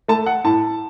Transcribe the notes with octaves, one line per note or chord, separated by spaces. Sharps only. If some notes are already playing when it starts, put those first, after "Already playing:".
A3 A5
F#5
A2 A5